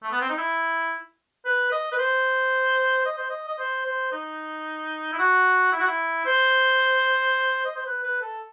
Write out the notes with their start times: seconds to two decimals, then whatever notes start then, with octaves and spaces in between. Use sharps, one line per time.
0.03 A3
0.12 B3
0.21 C4
0.29 D#4
0.38 E4
1.45 B4
1.72 D#5
1.92 B4
1.99 C5
3.06 D#5
3.18 C5
3.30 D#5
3.48 D#5
3.59 C5
3.86 C5
4.12 D#4
5.13 E4
5.19 F#4
5.72 E4
5.80 F#4
5.87 E4
6.26 C5
7.65 D#5
7.76 C5
7.86 B4
8.04 B4
8.22 A4